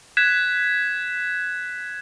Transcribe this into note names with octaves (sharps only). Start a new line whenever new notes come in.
F#6 G#6 B6 E7